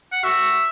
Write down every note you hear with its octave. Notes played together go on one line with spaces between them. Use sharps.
F#5
F#4 E5